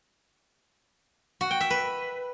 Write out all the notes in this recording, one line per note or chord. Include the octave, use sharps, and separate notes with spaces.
F#4
G5
E5
B4